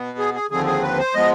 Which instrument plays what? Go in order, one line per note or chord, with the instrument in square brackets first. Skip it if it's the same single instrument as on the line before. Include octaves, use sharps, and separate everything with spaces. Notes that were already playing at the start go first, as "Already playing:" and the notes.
Already playing: [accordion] B2 B3
G#4
G#4
D#2 D3 F3 C4 G#4
G#4
B4
C5
F3 G#3 B3 D#5